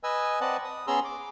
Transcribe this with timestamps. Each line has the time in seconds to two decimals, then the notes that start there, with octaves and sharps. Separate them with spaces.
0.04 B4 D#5 G#5 E6
0.41 C4 B4 D5 D#5 F#5 A5
0.64 D#6
0.87 B3 C#4 G#4 A#5 C6 E6
1.05 D6